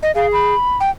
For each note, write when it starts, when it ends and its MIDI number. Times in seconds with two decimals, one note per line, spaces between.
0.03 0.11 75
0.15 0.55 68
0.15 0.27 77
0.33 0.78 83
0.80 0.90 79